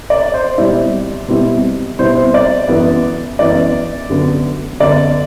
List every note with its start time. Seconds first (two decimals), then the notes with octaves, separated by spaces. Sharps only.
0.10 D5
0.29 D5
0.34 C5
0.58 B2 G3 C4 E4 D5
1.28 B2 G3 C4 E4
1.99 B2 G3 C4 E4 C5
2.34 D5
2.68 F#2 E3 B3
3.39 F#2 E3 B3 D5
4.09 F#2 D3 F#3 B3 D4
4.80 F#2 D3 F#3 B3 D4 D5